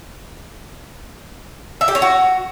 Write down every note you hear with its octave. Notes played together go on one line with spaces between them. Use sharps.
E5
G4
C#5
F#4